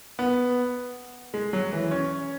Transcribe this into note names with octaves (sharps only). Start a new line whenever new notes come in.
B3
G#3
F#3
E3
C#4